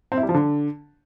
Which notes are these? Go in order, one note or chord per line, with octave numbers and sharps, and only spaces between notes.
C4
E4
G3
F3
D3